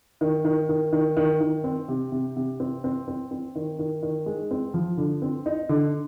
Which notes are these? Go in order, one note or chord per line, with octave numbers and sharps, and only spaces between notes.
D#3
D#3
D#3
D#3
D#3
D#3
C4
C3
C3
C3
C4
C4
C4
C4
D#3
D#3
D#3
G#3
C4
F3
D3
C4
D#4
D3